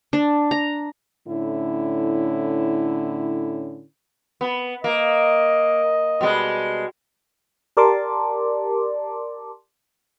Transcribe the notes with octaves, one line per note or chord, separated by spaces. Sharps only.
D4
A#5
A2 D3 C#4 E4
B3
A#3 D#5
B2 G3 G#3
G4 A#4 D5 A5 C6 D6